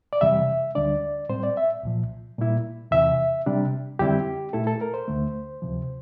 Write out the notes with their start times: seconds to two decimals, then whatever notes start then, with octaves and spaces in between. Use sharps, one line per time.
0.13 D5
0.21 F2 C3 E3 G3 E5
0.75 D2 D3 G3 D4 D5
1.29 A2 G3 C4 C5
1.43 D5
1.57 E5
1.83 C2 A#2 F3
2.38 A#2 G3 A#3 E4
2.91 E2 C3 E3 E5
3.46 C3 G3 D4
3.99 F2 D3 G3 C4 E4 G4
4.53 A#2 A3 E4 A4
4.67 A4
4.81 A#4
4.94 C5
5.08 D2 D3 A3
5.62 D2 C3 F3